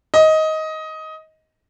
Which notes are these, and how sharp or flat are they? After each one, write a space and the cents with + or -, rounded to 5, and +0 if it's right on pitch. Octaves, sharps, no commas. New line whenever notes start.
D#5 +15